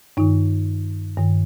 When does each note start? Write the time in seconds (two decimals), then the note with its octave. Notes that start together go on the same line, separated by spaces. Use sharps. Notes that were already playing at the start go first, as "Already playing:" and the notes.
0.17 G2 D#3 D#4
1.18 G2 D#3